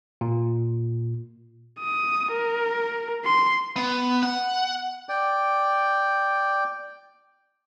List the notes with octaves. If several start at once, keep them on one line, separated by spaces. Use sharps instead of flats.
A#2
D#6
A#4
C6
B3
F#5
D5 G5